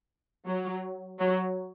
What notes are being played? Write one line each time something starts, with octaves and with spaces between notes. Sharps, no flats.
F#3
F#3